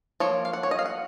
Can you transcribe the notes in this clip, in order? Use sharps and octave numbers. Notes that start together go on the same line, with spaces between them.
F3 A#3 C#5
F5
F#5
C#5
D#5
F5
F#5